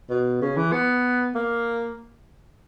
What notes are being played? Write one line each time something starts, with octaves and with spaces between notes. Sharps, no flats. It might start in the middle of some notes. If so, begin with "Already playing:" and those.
B2
C#3
E3
B3
A#3